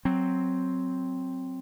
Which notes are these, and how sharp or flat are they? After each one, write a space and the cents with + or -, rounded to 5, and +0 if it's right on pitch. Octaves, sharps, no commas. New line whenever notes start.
F#3 +0 C4 +0